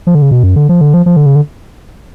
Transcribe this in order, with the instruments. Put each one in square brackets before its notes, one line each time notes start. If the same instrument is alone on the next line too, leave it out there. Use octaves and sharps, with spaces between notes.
[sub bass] F3
D3
C#3
B2
F#2
D3
F3
D3
F3
F3
D3
C#3
D3